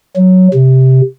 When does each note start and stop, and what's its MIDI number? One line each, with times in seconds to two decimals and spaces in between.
0.16 0.48 54
0.54 1.01 48